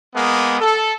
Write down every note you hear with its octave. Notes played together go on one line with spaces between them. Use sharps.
G#3 A#3 B3
A4